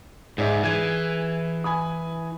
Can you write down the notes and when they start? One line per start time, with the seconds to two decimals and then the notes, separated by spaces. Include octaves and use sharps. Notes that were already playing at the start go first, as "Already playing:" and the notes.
0.38 G#2 G#4 D5 E5
0.63 E3 G#4 G#6
1.64 G#5 B5 D#6